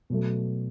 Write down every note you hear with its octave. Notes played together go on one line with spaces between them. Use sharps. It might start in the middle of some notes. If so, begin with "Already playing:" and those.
B2 F#3 A3